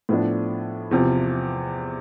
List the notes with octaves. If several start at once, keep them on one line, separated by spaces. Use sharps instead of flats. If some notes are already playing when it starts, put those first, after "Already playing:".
A2 F3 B3 D4
E2 C3 F3